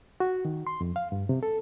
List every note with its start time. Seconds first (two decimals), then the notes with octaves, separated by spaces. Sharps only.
0.20 F#4
0.45 D#3
0.67 C6
0.81 F2
0.96 F5
1.12 G2
1.29 C3
1.43 A4